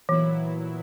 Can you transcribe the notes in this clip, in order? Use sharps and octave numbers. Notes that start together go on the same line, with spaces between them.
A#2 E3 F#3 B3 E4